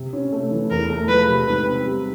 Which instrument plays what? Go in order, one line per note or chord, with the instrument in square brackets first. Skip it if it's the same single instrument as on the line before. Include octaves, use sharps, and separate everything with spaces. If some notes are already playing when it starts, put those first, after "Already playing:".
Already playing: [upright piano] C3
C#4
A3
E3
[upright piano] E2 [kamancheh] A#4
[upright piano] A3
[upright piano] F3 [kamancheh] B4
[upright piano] C3
[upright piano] G#2 [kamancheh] B4
[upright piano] C4
G3